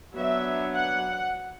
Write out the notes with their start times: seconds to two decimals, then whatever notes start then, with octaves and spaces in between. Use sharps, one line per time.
0.15 F#3 B3 D4 E5
0.74 F#5